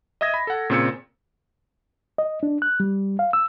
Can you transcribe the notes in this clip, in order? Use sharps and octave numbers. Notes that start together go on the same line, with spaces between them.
D#5 E5 D#6 G#6 A#6
B5
A4 F#5
A#2 C#3 C4 E6 G#6 C#7
D#5
D4
F#6
G3
F5
E6